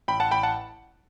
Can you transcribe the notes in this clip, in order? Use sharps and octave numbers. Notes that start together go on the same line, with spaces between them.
A1 G5 B5
F#5 A5
A1 G5 B5
F#5 A5